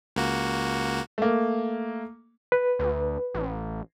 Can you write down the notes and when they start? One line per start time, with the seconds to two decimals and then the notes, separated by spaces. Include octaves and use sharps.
0.16 C#2 A#3 F#4
1.18 A3 A#3
2.52 B4
2.79 D2
3.34 A1